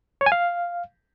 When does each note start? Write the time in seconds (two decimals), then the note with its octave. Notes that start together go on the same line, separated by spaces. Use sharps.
0.21 C#5
0.26 G#5
0.32 F5